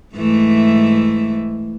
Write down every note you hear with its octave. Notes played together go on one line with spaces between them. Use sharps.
G#2 E3 A3